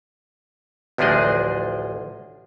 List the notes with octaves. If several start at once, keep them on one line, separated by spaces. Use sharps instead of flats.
A1 D2 F3 D4 G#4 D#5